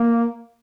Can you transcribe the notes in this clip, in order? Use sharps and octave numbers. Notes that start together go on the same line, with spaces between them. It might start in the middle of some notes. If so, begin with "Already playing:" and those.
Already playing: A#3